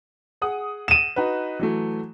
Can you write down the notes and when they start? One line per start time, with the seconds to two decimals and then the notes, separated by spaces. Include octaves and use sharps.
0.41 G#4 F#5 D#6
0.88 D#7 E7
1.16 D#4 F#4 B4
1.59 E3 F#3 A3